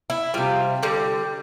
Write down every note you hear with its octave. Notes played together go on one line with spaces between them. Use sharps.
E4
C3 G3 F4
D3 G3